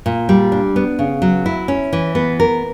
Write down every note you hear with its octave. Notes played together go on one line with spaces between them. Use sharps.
A#2
G3
D4
B3
C#3
F#3
E4
C#4
E3
B3
A#4